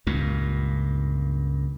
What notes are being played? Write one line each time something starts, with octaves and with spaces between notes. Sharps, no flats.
C#2 G2 A#2